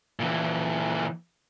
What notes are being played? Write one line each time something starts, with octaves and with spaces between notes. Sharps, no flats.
A#2 E3